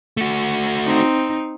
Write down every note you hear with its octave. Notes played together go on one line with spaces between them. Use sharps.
A3 F#4
C4 D#4